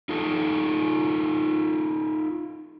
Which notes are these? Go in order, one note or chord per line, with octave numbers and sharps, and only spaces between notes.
D#4 F4 A4